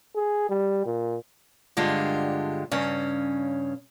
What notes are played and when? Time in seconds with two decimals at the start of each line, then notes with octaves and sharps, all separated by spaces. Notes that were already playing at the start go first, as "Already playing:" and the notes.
0.16 G#4
0.50 G3
0.86 A#2
1.77 G2 D3 G#3 F4 G4
2.72 G2 C#3 C#4